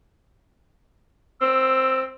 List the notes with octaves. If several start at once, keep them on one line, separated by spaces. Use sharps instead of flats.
C4 E6